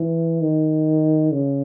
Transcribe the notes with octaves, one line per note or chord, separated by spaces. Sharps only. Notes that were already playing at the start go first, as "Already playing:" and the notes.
Already playing: E3
D#3
C#3